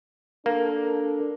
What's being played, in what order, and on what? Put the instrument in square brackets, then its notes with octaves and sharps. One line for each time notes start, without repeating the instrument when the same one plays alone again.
[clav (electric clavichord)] A#3 [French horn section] D4 A4